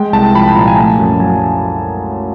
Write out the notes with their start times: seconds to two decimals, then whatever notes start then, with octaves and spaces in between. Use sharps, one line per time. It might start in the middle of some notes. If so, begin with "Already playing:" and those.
Already playing: G#3 G5
0.13 C2 A5
0.34 F3 B5
0.47 A5
0.55 A#2 A#5
0.67 G#5
0.77 A3 A5
0.99 F#2
1.20 F#3 G#5